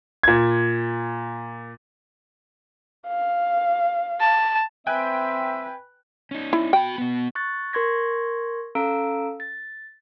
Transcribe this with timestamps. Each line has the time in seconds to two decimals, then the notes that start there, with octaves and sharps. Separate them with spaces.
0.23 A#2 G#6
3.08 F5
4.21 A5
4.87 C4 B4 E5 G5 G#5 F#6
6.31 C#4 D#4
6.53 E4
6.73 F#4 G5 B5
6.98 B2 B3
7.35 C#6 F#6 A6
7.73 A#4 C6 C#6 G#6 A#6
8.75 C#4 A4 F5 A#5 E6 D7
9.40 A6